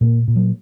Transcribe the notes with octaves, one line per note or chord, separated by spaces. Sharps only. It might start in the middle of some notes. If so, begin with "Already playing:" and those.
A#2 A#3
A#2
F#3